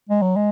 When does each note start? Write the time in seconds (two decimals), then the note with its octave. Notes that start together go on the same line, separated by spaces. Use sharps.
0.09 G#3
0.22 F#3
0.36 G#3